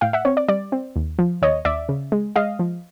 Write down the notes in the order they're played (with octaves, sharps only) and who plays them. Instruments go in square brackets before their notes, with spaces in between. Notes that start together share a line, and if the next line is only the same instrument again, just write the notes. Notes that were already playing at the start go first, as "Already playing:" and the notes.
[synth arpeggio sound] A2 F5 G5
E5 F#5
C4 C#5
D5
G3 D5
C4
D#2
F3
D#2 C#5 D#5
D#2 D5 E5
C#3
G#3
G#3 D#5 F5
F3